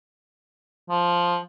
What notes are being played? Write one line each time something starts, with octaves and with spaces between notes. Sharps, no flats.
F3